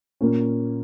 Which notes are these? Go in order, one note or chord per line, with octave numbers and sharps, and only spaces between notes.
A#2 A#3 C#4